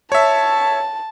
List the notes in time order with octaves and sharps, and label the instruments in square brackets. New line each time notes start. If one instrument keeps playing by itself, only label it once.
[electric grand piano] C#5 E5 [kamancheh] A5